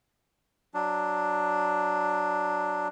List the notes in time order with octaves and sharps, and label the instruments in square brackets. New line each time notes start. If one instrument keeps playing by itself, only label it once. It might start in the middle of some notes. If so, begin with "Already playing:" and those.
[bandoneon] F#3 D4